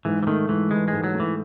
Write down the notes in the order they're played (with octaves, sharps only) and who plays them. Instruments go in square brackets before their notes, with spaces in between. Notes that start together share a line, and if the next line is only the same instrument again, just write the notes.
[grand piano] G#2 [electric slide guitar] E3
[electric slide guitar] E3
[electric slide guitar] D#3 [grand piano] A3
[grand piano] G#2 [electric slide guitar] E3
[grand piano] E3 [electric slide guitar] G#3
[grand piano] G#2 [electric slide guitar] G#3
[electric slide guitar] F#3
[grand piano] A3
[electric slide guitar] E3